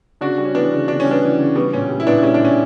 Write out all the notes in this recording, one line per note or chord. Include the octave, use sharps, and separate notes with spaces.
C#3 D4 F#4
G3
C#4
E3 B3 D4
C#3
C#3 D4
C#4
G3
B3 D4
E3
C#3
G3 B3
A#2 C#4
G3
E4
A#2 B3 D4
G3 C#4
D4
A#2 C#4